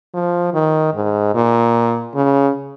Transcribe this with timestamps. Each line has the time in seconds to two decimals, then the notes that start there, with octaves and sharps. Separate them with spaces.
0.14 F3
0.54 D#3
0.94 G#2
1.34 A#2
2.14 C#3